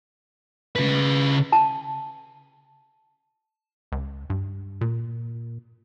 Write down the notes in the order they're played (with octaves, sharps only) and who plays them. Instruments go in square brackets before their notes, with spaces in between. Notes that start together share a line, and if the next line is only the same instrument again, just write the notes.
[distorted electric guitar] C#3 B4
[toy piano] A5
[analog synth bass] C#2
G2
A#2